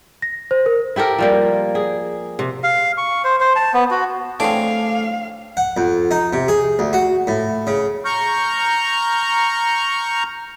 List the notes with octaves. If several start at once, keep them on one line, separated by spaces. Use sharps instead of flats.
A#6
C5
A#4
E4 G4 A4 A#4
F3 G3 A#3
G#4
C3
F5
C#6
C5
C5
A5
B3
F#4
A2 C4 D4 G#4 F5 D6
F#5
F2
D#4
C3
G#4
D2
F#4
A2
C#3
A#5 C#6 F6 G6